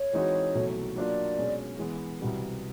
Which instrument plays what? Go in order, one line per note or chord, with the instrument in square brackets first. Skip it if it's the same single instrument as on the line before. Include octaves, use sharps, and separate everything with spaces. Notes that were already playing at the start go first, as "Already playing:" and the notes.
Already playing: [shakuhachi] C#5
[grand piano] E3 G#3 C4 D#4 F#4
C2 B2 F#3 A3
[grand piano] F#3 A#3 D4 F4 [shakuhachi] D5
[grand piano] B2 G#3 C#4
E3 G#3 B3
C2 B2 G3 B3